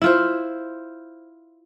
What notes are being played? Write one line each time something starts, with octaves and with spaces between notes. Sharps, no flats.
E4 F4 C5